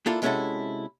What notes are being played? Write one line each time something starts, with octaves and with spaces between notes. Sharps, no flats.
A#3 D4 E4 F4 A4
C3 G#3 C#4 E4 F#4 A4